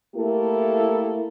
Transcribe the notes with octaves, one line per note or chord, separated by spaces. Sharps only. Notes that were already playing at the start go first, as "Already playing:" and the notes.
A3 A#3 E4 G4 A4 A#4